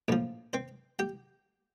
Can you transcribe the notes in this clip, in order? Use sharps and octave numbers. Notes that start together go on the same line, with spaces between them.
A#1 A2 F3
C4 C5
G4 G5